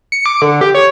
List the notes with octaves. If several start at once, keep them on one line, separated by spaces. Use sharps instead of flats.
C#7
D6
D3
G4
C#5